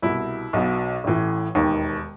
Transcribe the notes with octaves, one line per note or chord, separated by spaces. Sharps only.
C2 B2 E4
B1 B2
A1 A2 E3
E1 D#2 D#3